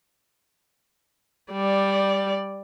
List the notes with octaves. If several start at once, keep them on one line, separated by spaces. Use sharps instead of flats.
G3 D5